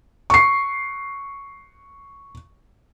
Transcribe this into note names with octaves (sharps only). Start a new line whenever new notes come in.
C#6 C7